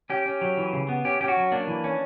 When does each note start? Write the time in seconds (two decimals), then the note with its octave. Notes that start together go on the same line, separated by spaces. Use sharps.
0.10 C#4 G4
0.26 C#4
0.41 F#3
0.57 E3
0.73 C#3
0.89 B3
1.05 C#4 G4
1.21 C#4 G4
1.28 F#4
1.37 F#3
1.52 A#3 D4
1.67 E3
1.84 C#4